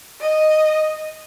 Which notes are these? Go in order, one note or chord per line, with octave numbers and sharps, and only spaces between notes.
D#5